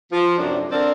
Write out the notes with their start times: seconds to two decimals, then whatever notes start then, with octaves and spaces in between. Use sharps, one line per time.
0.12 F3
0.37 F#2 A2 C3 D4 D5
0.70 D3 C4 A#4 C5 D5